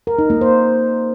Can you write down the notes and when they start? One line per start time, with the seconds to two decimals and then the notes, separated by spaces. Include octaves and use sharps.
0.07 A#4
0.18 D#4
0.30 A#3
0.41 C5